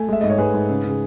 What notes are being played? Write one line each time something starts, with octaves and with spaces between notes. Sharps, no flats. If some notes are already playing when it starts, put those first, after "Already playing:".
Already playing: A3 G#5
G#3 E5
G#2 D#5
C#5
G#2 G#4 B4
G#2
C#3
C#3
G#4